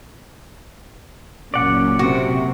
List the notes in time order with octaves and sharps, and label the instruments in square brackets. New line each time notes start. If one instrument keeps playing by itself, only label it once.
[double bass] F#1 A#2 [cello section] F#3 C#4 [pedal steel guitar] D5 F#5
[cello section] C3 [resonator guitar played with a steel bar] F#4